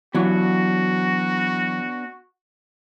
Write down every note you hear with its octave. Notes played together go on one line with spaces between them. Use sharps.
E3 F#3 B3 D4 F#4 C#5